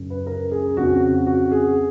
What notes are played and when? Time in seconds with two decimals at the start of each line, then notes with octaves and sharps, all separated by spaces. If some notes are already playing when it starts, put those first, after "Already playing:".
Already playing: F#2 C#3
0.10 B4
0.27 A#4
0.51 G#4
0.77 F2 C#3 F#4
1.26 F#4
1.51 G#4